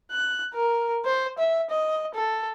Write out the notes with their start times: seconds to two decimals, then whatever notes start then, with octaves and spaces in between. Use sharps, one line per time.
0.11 F#6
0.54 A#4
1.05 C5
1.38 E5
1.70 D#5
2.15 A4